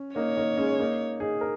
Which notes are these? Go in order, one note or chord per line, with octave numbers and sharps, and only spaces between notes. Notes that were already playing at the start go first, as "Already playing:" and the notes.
Already playing: C#4
A#3 D#4 C#5
A#3 D#4
G#3 C#4
A#3 D#4
D#4 G#4
A#4